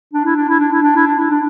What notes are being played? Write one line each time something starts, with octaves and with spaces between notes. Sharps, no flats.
D4
E4
D4
E4
D4
E4
D4
E4
D4
E4
D4